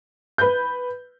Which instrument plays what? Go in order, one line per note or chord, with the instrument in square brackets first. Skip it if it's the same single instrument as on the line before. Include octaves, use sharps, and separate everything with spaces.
[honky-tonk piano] B4 G6